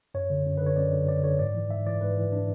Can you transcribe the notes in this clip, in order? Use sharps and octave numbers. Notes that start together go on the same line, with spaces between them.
F#2 C#5
D3
F#2
D3 B4
C#5
F#2 D5
D3
F#2 D5
D3 C#5
G#2 D5
E3
G#2 E5
E3 D5
G#2 B4
E3
D4